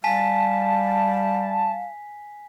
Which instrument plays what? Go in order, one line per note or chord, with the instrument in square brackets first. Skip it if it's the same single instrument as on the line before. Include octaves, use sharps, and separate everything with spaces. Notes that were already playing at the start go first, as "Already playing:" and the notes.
[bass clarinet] G3 [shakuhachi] F5 [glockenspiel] G#5 B6 [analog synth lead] A5